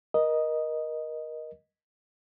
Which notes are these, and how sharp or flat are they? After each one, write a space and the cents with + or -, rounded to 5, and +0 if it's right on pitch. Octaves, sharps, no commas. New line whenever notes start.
A#4 +25 D#5 +0